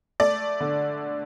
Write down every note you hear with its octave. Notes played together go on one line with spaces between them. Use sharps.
A3 D5
D3